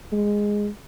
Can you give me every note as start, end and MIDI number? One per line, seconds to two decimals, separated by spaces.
0.12 0.68 56